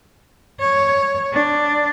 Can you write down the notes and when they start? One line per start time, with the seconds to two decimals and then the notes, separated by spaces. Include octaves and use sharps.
0.60 C#5
1.33 D4